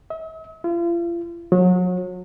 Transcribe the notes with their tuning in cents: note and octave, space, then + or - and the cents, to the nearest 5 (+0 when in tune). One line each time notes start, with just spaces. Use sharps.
E5 -45
F4 -40
F#3 -35